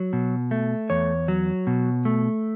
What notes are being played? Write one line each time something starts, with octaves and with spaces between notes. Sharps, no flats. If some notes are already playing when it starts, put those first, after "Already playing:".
Already playing: F#3
B2
A3
E2 C#5
F#3
B2
A3